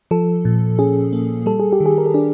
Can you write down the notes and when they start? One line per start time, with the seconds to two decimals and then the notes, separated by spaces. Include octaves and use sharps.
0.11 F3 A4
0.45 A#2
0.79 C#4 G#4
1.13 A#3
1.46 G3 A4
1.60 G#4
1.72 G4
1.80 D#3
1.86 G#4
1.98 A#4
2.06 A4
2.14 D4 G#4